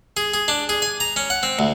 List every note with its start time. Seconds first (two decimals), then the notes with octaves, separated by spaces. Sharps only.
0.17 G#4
0.34 G#4
0.48 D4
0.69 G#4
0.82 G#5
1.00 A#5
1.16 C#4
1.30 F#5
1.43 C4
1.59 D2